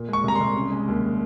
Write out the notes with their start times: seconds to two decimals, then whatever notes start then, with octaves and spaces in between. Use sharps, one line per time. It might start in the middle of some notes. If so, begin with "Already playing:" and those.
Already playing: A#2
0.09 G#3 C#6
0.24 C2 A#5
0.35 C6
0.41 C2
0.56 C#3
0.71 G#3
0.88 D#2